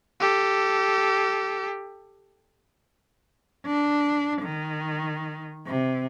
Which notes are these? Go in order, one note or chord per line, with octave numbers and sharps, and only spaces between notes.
G4 A4
D4
D#3
C3